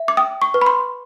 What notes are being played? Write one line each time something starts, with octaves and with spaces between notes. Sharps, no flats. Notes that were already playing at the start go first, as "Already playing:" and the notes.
Already playing: E5
D6
G5 D#6
C#6
B4
B5
C6